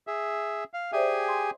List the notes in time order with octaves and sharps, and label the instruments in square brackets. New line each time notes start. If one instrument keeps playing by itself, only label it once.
[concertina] G#4 E5
F5
[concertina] G4 G#4 G#5 [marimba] C5 D5 E5
[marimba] C6